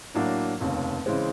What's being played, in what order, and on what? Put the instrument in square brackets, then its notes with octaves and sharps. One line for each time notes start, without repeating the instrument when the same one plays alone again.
[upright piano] A2 F#3 A#3 D4
F1 D#2 C#3
C#3 E3 G#3 C4